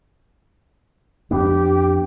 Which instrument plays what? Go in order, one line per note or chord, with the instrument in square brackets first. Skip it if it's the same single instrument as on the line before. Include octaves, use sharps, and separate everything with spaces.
[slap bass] F2 B3 D4 [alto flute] G4